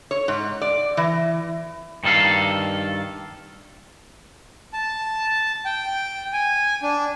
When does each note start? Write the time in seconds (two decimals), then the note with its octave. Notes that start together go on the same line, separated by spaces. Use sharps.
0.11 C#5
0.28 G#2
0.61 D5
0.97 E3
2.04 G2 D#3 A4 F5
4.73 A5
5.65 G5
6.33 G#5
6.83 D4